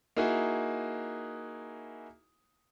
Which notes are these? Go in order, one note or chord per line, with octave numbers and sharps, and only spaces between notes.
A#3 D#4 E4 F#4 G#4